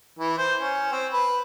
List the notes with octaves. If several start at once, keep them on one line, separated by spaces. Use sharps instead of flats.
E3
C5
C#4
C4
B4